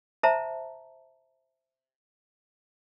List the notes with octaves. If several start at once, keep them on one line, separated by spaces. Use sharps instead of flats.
C5 E5 A5 A#5